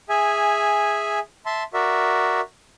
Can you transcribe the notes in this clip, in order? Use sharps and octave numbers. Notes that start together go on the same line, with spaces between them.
G#4 E5 G#5
E5 A5 C6
F#4 A#4 D5 E5